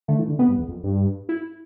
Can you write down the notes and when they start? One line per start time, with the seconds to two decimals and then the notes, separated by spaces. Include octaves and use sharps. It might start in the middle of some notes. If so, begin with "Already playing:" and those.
0.08 D3 A3
0.19 E3
0.29 D3
0.39 C3 B3
0.49 G2
0.59 E2
0.68 F2
0.84 G2
1.29 E4